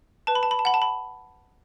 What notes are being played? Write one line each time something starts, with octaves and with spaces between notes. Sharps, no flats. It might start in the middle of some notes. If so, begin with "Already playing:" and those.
B4 A5
B5
A5
B5
A5
F#5 B5
A5
B5